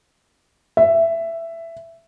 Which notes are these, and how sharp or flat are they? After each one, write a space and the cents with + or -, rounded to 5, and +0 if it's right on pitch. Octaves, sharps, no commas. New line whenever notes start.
E5 +10